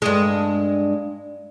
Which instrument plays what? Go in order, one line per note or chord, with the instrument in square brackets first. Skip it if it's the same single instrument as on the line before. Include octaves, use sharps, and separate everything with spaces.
[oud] G2 G#3